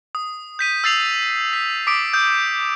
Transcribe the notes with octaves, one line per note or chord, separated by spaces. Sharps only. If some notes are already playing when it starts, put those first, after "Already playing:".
D#6
G6 B6 D#7
E6 A6 C7 F7
B6
D6 D#6 B6 D7
D#6 G6